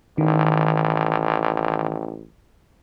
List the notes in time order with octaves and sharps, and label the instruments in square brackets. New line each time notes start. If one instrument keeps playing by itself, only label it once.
[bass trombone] A1 [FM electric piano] D#3